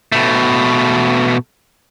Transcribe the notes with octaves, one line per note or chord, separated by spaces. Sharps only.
B2 A3